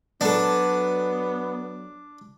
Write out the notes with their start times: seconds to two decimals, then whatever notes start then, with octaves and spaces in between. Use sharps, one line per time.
0.21 F#3 B3 D4 A4